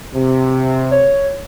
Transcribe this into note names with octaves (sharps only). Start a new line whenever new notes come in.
C3
C#5